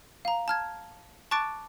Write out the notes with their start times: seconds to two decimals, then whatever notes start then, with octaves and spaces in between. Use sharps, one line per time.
0.25 F5 A#5
0.48 A5 F6 G#6
1.31 A5 C#6 D6 F#6 A6 D7